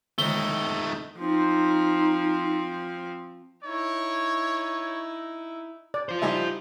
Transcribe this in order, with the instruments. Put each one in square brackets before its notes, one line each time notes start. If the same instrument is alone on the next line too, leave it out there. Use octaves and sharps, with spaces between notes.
[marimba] D3 D#3 G#3 [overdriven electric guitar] A3 D#4 [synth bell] G7
[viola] F3 C4 [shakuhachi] D#4
[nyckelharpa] D#4 E4 [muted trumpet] C#5
[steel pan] D5
[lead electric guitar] F4 C5
[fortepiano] G3 D#4 E4 [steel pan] E5 G#5